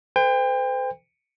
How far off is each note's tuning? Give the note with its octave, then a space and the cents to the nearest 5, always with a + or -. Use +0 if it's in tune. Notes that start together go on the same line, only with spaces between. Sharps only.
A4 +10 C5 -40 G5 +30